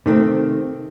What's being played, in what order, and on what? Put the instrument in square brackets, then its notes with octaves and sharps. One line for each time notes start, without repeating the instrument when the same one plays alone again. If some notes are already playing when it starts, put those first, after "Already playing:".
[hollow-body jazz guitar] C3 D#3 A3 C4